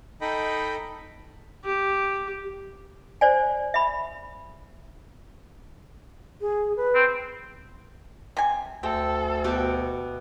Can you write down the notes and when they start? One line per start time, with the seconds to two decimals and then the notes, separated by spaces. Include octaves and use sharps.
0.21 D#4 A4 D#5 G5 B5
1.64 G4
3.21 C5 D5 G#5
3.74 E5 B5
6.41 G#4
6.77 B4
6.95 C4
8.37 C3 G#5
8.83 D2 C4 A4
9.44 B2 G4 D6